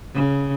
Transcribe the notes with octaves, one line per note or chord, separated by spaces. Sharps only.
C#3